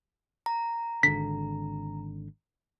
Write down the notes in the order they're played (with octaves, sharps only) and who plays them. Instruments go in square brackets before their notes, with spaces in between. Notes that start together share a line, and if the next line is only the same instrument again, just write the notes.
[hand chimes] A#5
[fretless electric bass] G#1 D3 [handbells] B6